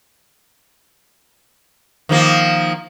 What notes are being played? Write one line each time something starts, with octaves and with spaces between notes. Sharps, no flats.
D#3 F3 A#3